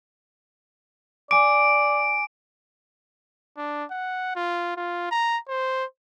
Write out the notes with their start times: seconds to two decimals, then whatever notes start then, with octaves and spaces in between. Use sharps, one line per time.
1.31 D5 G#5 D6 D7
3.57 D4
3.91 F#5
4.36 F4
4.77 F4
5.11 A#5
5.48 C5